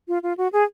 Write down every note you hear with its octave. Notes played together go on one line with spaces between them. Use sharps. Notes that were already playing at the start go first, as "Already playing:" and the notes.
F4
F4
F#4
G#4